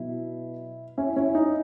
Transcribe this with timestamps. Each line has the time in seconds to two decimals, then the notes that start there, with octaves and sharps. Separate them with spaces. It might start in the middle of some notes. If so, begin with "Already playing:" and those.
Already playing: B2 F#3 E4
0.98 C#4 E4
1.16 C#4 E4
1.35 D#4